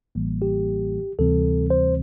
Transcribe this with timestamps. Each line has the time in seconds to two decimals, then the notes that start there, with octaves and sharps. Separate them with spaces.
0.15 A1 A2 E3 G3 A#3
0.42 G4
1.19 D2 C3 E3 G3 C4 A4
1.70 C5